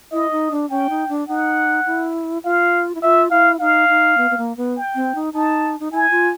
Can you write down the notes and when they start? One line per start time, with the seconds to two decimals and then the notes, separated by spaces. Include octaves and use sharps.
0.12 E4 D#5
0.31 D#4
0.51 D4
0.70 C#4 G5
0.90 D#4
1.09 D4
1.28 D#4 F#5
1.86 E4
2.44 F4 F5
2.95 E4
3.03 F4 E5
3.31 E4 F5
3.60 D#4 F5
3.89 D#4
4.17 B3
4.31 B3
4.38 A#3
4.57 B3
4.77 G5
4.95 C4
5.15 D#4
5.33 D#4 A5
5.80 D#4
5.92 E4 G#5
6.11 F4